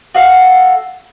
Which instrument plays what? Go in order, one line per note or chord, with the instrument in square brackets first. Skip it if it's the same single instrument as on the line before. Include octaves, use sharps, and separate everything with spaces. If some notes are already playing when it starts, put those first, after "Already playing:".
[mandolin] F#4 A4 F5